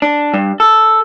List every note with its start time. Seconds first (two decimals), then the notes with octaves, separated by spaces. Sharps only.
0.02 D4
0.34 G2
0.60 A4